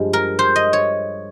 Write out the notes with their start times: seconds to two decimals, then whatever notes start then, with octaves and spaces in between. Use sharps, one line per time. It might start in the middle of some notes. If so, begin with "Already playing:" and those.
Already playing: G2 F3 G#3
0.13 A#4
0.39 C5
0.56 D#5
0.73 C#5